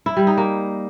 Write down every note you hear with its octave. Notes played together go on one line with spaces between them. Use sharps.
E4
G3
D#4
A#3